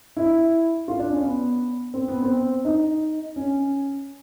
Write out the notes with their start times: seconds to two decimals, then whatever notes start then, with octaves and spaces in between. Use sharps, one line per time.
0.17 E4
0.88 F4
0.99 D4
1.11 C#4
1.23 B3
1.94 C4
2.08 B3
2.22 C4
2.65 D#4
3.36 C#4